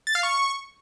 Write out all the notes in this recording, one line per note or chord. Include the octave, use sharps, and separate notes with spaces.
A6
F5
C#6